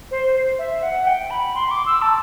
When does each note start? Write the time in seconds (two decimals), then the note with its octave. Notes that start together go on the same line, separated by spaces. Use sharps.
0.11 C5
0.59 E5
0.82 F#5
1.07 G5
1.30 B5
1.55 C6
1.71 D6
1.86 E6
2.02 A5